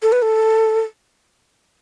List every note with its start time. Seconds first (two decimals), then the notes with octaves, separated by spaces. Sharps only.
0.03 A4
0.12 B4
0.22 A4